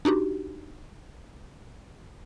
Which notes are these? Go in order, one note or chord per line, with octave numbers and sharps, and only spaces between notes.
D4 D#4 F#4 G4